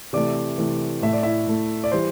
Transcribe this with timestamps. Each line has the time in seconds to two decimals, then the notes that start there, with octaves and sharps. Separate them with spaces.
0.13 C3 E3 A3 D5 D6
0.58 C3 E3 A3
1.02 A2 A3 E5
1.13 D5
1.23 E4 E5
1.47 A2 A3
1.84 D5
1.92 E3 G3 C5